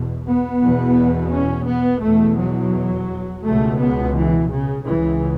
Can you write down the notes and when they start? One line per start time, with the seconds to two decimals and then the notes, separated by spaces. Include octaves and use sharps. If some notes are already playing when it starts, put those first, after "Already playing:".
Already playing: E2 B2
0.26 B3
0.62 E2 B2
1.33 C#4
1.68 B3
2.04 E2 B2 A3
2.39 F#3
3.46 C#2 B2 A3
3.81 B3
4.17 E3
4.52 C#3
4.87 C#2 C#3 E3